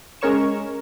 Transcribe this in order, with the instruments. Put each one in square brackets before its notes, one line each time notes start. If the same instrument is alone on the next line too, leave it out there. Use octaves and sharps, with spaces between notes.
[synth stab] G#3 C#4 A#4 C#5 C#6 E7